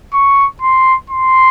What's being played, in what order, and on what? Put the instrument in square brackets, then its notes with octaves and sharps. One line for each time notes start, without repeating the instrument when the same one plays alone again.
[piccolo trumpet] C#6
C6
C6